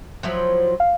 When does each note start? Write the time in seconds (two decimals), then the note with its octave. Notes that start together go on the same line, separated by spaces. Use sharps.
0.23 F3 F#3 E4
0.80 F5